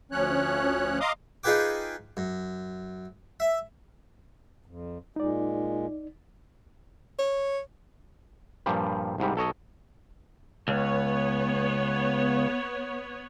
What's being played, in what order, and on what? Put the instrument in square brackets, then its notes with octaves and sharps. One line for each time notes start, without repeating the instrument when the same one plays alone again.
[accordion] D2 F3 C#4 C#5 F#6
D#5 F5 A#5 C6 D6 D#6
[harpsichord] D#4 F4 G#4 B4 G5 D6
F#2
E5
[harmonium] F2
[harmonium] A#2 G#3 [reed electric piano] D#4 D5
[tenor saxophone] C#5
[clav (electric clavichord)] G2 A#2 F3 G3
C2 G#2 G3
B1 A4 C#5 D#5
[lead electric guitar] C#2 [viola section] B3 C#5